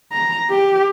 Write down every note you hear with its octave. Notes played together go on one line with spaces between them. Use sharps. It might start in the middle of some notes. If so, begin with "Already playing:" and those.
A#5
G4